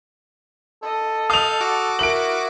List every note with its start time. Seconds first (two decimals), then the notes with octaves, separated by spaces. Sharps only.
0.83 A4 D#5
1.30 F5 D#6 G6 F7
1.61 F#4 D6
1.99 E4 A#4 D7 F#7